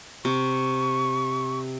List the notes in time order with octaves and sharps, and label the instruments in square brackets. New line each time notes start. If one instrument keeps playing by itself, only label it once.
[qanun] C3 [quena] C#6